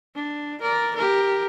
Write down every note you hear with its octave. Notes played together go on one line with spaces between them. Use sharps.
D4
A#4 D5
G4 A#4